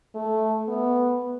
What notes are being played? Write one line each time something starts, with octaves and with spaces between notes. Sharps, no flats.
A3
B3